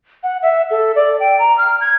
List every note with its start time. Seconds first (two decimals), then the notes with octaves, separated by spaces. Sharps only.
0.23 F#5
0.42 E5
0.70 A4
0.95 D5
1.20 G5
1.39 A#5
1.58 F6
1.81 G#6